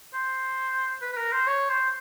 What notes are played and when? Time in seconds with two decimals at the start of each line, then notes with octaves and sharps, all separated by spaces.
0.14 C5
1.02 B4
1.13 B4
1.17 A#4
1.32 C5
1.47 C#5
1.69 C5